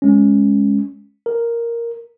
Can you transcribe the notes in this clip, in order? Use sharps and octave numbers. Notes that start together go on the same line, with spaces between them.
G#3 C#4
A#4